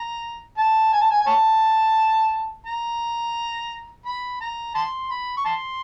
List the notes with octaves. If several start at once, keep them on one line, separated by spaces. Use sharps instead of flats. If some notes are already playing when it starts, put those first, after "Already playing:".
Already playing: A#5
A5
G#5
A5
G#5
G#5
C#5 A5
A#5
B5
A#5
A5 C6
B5
C#6
A5 C6